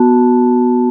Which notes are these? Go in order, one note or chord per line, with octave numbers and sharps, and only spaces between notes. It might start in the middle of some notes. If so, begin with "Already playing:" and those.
Already playing: B3 F#4 A5